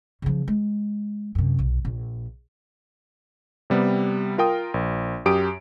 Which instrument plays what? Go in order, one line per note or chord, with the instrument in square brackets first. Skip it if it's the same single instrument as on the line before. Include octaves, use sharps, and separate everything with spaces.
[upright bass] C#3 F3
G#3
F#2 C3
B1
A#1
[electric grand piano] C3 G3 B3
F4 A#4 G5 D#6
A#1
F#2 G4 D#6 D7